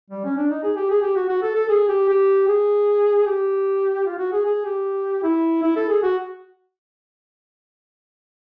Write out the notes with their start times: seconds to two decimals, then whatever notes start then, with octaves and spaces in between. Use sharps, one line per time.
0.10 G3
0.24 C#4
0.37 D4
0.51 D#4
0.63 G#4
0.76 G4
0.90 G#4
1.02 G4
1.16 F#4
1.29 F#4
1.42 A4
1.55 A4
1.69 G#4
1.88 G4
2.08 G4
2.48 G#4
3.26 G4
4.06 F4
4.18 F#4
4.32 G#4
4.45 G#4
4.65 G4
5.23 E4
5.63 E4
5.76 A4
5.89 G#4
6.03 F#4